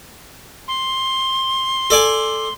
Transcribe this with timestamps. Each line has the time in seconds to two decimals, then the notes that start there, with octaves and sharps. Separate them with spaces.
0.68 C6
1.90 A4 D5 G#5